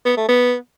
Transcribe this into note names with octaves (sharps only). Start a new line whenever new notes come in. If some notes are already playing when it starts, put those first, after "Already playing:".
B3
A3
B3